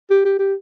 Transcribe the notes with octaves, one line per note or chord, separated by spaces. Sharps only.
G4
G4
G4